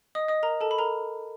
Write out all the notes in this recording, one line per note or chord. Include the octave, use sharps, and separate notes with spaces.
D#5 D#6
D#5 D#6
A#4 A#5
A4 A5
B5
A#4 A#5